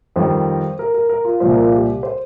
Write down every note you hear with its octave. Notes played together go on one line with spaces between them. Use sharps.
F2 D#3 G3 C5
A#4
A#4
A#4
F4
C2 A#2 F3 C5
A#4
F4
G4
C5